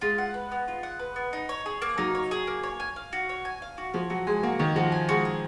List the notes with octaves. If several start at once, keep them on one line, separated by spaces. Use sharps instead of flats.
G#3 F4
F#5
B4
B3
F4
F#5
B4
B3
D#4
C#5
G#4
A#3
F#3 D#4
C#5
G#4
A#3
C#5
G#5
F5
F#4
C#5
G#5
F5
F#4
F3 C#5
F#3 F#4
G#3 G#5
A#3 F#4
D#3 C#5
F3 F#4
G#5
G#3 F#4
G#4